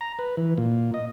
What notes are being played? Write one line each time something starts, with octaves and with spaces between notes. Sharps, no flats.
A#5
B4
E3
A#2
D#5